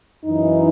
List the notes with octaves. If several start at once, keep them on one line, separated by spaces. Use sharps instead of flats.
F#2 E3 D#4